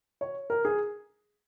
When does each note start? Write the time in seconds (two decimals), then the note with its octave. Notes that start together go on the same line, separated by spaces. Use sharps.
0.21 C#5
0.50 A#4
0.65 G#4